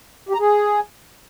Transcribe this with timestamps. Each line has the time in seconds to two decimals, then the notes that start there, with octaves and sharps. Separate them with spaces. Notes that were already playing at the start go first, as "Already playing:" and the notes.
0.29 G4
0.34 A#5
0.40 G#4